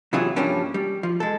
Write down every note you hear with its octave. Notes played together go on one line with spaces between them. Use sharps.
C3 E3 F#3 E4 F4 G#4
G2 A#2 F3 G3 C#4 D4
G3
F3
G#3 A4